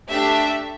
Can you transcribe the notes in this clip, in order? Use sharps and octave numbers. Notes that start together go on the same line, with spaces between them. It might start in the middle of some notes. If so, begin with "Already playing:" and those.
A3 D4 G4 E5